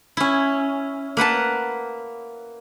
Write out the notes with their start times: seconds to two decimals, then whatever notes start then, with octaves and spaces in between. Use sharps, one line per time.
0.17 C#4 E4
1.17 A#3 B4 F#5 A5